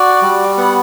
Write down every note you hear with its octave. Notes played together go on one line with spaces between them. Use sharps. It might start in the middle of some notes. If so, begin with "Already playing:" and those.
Already playing: F#4 D5
G3
B3 F#5